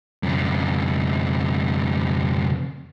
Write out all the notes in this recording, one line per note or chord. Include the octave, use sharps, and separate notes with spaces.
F2 C#3